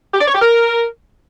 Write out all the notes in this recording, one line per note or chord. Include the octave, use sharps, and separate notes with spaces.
G4
D5
C#5
G4
A#4